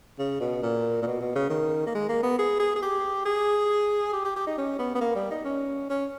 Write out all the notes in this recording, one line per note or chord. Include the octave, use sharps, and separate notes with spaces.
C#3
B2
A#2
A#2
B2
B2
C#3
D#3
A#3
G#3
A#3
B3
G#4
G#4
G#4
G4
G#4
G4
G4
G4
D#4
C#4
B3
B3
A#3
G3
D#4
C#4
C#4